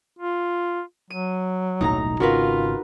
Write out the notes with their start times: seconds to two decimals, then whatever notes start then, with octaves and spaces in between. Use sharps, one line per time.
0.19 F4
1.10 F#3 D#7
1.81 D#1 B1 A2 D#4 A#5
2.20 G#1 C#3 F4 F#4 A#4 B4